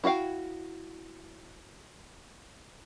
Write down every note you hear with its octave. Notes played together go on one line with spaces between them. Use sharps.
E4 F#4 C#5 F5 G5